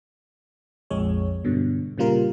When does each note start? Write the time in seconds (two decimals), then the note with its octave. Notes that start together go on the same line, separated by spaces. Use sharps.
0.90 A#1 F2 G#3 C#5
1.44 G2 B2 D3
1.98 A#2 C#3 G3 F4 A#4